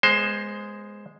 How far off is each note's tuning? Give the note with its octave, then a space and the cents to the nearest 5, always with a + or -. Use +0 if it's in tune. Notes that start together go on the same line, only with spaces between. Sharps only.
G#3 +0 B3 -10 C5 +15